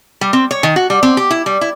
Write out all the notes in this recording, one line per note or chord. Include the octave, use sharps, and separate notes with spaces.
G3
C4
C#5
D#3
F#4
G3
C4
G4
E4
G3
E4